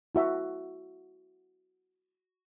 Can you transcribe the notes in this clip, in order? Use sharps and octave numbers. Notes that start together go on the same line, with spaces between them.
E4 F#4 E5